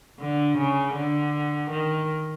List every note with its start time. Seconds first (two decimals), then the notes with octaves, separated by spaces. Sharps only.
0.21 D3
0.58 C#3
0.96 D3
1.71 D#3